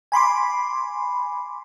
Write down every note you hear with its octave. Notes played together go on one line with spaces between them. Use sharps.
G#5 B5 C6 D6